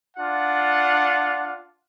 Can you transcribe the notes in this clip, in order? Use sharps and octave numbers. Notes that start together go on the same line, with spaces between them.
D4 F4 F#5